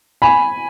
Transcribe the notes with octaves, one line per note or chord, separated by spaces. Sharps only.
G#5 B5